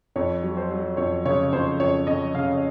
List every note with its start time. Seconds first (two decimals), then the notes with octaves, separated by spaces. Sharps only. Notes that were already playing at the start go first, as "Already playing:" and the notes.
0.16 F2 C#5
0.43 F#3
0.57 C5
0.71 F#3
0.97 F2 C#5
1.25 C#3 C#5
1.52 F2 C5
1.80 F2 C#5
2.07 F2 D#5
2.34 C#3 F5